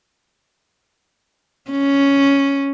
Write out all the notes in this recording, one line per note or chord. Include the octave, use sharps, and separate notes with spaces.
C#4